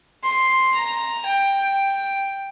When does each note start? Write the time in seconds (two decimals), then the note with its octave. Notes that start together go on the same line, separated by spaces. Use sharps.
0.24 C6
0.74 A#5
1.26 G5